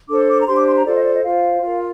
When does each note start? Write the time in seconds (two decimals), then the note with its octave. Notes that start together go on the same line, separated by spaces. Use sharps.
0.08 D4 A4 C5 D6
0.28 D6
0.41 A#5
0.47 D4 G4 C5 C6
0.56 D6
0.67 C6
0.76 A#5
0.85 F4 A4 C5 D5
0.95 D#5
1.05 D5
1.14 D#5
1.24 F4 C5 F5
1.63 F4 A#4